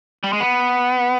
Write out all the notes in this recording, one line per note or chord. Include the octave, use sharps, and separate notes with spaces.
G3
G#3
B3